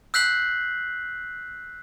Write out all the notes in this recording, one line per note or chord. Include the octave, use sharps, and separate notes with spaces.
E6 F#6 G6 B6 C7 F#7